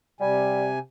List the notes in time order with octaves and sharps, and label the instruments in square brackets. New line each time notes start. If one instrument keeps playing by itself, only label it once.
[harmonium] C3 G#5 [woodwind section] G3